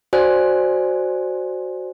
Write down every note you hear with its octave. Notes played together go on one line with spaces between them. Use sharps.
F#4 C5 D5 G#5 F#6